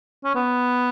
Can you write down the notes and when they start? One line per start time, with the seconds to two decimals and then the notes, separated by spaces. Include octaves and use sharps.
0.25 C#4
0.35 B3